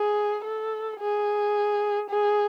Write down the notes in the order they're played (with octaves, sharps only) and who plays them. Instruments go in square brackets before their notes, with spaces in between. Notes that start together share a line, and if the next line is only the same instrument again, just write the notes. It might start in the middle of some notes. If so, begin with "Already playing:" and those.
Already playing: [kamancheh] G#4
A4
G#4
G#4